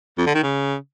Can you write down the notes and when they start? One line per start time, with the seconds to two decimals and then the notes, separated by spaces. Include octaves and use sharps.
0.18 F2
0.26 D3
0.35 D#3
0.43 C#3